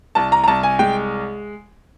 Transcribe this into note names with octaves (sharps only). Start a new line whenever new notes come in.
C2 A5
A#5
A#5
C2 A5
G#5
G#3 G5